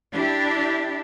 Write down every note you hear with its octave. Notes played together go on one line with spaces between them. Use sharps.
D4 E4 G4